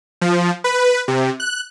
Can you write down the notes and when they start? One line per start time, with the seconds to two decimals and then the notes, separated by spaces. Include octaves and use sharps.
0.21 F3
0.64 B4
1.08 C3
1.40 F#6